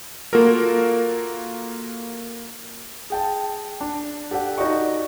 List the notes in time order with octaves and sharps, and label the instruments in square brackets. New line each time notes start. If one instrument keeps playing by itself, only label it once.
[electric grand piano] A#3 F4 F#4 A4 A#4
[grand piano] G#4 G5 A5
D4
G4 A4 D5 F#5
D#4 F#4 D5 D#5 C#6